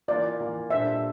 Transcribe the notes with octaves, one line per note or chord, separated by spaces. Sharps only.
E3 A#3 F4 D5
E3 A#3 F4
A#2 G3 D4 A4 C5 E5